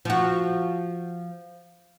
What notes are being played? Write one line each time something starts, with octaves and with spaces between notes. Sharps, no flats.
F3 F#4